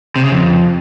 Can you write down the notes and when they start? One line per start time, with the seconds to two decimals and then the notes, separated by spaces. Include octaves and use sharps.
0.16 C3
0.24 C#3
0.32 F2